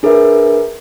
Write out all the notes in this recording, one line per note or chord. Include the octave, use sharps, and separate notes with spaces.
D4 G#4 A#4 B4 E5